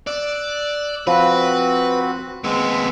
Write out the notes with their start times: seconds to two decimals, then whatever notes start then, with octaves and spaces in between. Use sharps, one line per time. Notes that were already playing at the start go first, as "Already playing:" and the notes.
0.07 D5 E6 F#6
1.07 F3 C4 F#4 B4
2.44 D#2 G#3 B3 C4 E6